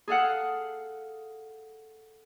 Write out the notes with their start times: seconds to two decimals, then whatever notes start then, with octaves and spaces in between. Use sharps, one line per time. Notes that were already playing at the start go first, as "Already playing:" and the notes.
0.08 G#4 A4 F5 F#5